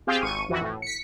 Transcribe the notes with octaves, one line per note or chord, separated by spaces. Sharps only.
C4 F4 G4 G#4 F5 G5
G#1 C#6 D#7
F2 E3 F#4
A2
B6 C#7